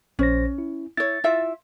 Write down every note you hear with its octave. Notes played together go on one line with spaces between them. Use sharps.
A#1 C#4 C5 A#6
E4
E4 C#5 A6
E4 F4 E5